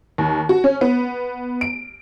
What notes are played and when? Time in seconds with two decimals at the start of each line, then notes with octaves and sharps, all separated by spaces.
0.18 D#2
0.49 F#4
0.64 C#4
0.81 B3
1.61 D7